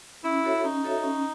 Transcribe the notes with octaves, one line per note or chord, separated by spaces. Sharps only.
C#4 E4
F#4 A4 C#5 E5
C#4 D#4
F#4 A4 C#5 E5
C#4